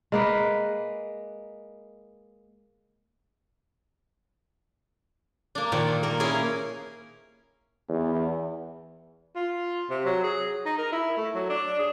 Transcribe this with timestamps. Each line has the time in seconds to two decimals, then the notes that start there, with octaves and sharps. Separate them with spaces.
0.12 G#3 A#3 B4
5.55 A#3 D4
5.72 A#2 D#3 F3
6.03 A#3 A#4
6.20 C#4 E4 G#4 A#4 F5
7.89 E2
9.36 F4
9.90 C3
10.05 F#3
10.23 G#4
10.66 D#4
10.78 A#4
10.92 E4
11.17 A3
11.35 F#3
11.49 D4
11.79 G#4